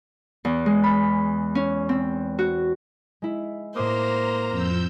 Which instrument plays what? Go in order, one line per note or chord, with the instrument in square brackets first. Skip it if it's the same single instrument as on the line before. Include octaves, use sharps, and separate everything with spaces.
[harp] E2
G#3
B5
C#4
C4
F#4
G#3 E4
[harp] A2 D6 D#6 [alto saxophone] A#3 [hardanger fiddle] C5 [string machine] A#5
[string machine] F2 E6 G6 [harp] F6